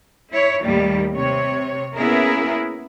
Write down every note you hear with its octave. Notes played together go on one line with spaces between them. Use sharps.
E4 C#5
D#2 A2 D#3 G3 A#3
C3 C#5
A#3 B3 C#4 E4 G#4 A#4